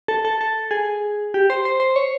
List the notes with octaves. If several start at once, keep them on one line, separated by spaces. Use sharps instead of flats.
A4
A4
A4
G#4
G4
C5
C5
C5
C#5